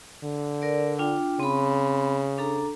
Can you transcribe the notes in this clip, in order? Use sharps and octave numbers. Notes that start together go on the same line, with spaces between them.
D3
A#4 D5
D4 F4 G5
C#3 C4 B5
D4 A4 A#5